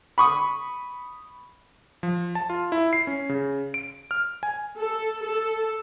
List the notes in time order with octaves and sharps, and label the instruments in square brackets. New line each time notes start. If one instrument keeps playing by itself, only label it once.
[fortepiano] B5 C#6 D#6
[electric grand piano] F3
A5
F4
E4
C7
C#4
C#3
D7
F6
G#5
[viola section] A4
A4